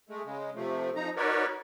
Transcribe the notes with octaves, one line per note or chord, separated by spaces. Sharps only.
G#3 A3
C#3 G#3
C3 F3 A3
F3 D#4 A#5
D#4 F#4 A#4 B4 C#5 D5